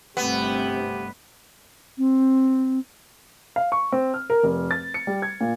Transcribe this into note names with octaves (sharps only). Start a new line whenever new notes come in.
G1 G2 C3 A3 B3 C4 G4
C4
F5
C#6
C4
F6
A#4
F1
A6
C#7
G3
G#6
A#2